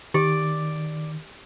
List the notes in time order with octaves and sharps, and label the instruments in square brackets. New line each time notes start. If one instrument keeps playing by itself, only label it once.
[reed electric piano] D#3 [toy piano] G4 [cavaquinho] D5